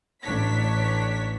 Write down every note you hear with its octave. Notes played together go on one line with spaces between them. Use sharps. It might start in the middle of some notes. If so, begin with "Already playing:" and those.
A1 D4 C#5 B6